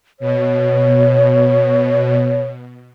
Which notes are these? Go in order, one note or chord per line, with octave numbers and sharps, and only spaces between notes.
B2 C#5